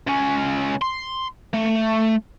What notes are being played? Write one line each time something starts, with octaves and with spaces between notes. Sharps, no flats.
C#2 C#4
C6
A3